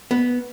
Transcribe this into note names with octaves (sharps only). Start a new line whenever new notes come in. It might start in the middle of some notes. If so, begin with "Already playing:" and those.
B3